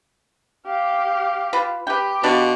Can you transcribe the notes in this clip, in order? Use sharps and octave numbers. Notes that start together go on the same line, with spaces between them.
G4 F5
F4 B4
G4 B4 G5
B2 D4 F4